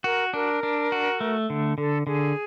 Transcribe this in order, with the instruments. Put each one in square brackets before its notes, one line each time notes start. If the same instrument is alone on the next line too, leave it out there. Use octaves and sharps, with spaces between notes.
[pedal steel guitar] F#4 [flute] A#4
[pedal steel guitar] D4 [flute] A#4
[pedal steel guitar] D4
F#4
A3
D3
[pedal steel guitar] D3 [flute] A4
[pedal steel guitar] D3 [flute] G#4